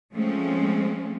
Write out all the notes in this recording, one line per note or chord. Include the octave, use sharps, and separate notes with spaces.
F3 G#3 A3 C4 C#4